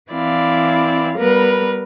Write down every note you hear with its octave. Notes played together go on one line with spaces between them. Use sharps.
E3 C4 E4 D5 F5
G3 B3 A#4 B4